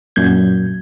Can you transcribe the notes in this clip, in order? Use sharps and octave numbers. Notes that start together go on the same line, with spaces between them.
F#2 A#2 G6 G#6